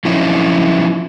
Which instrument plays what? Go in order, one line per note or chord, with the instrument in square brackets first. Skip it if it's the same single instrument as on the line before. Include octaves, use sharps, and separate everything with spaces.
[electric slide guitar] F3 F#3 C#4 D#4 E4